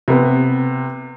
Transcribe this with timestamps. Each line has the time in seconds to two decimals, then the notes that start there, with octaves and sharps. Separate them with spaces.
0.08 C3 B3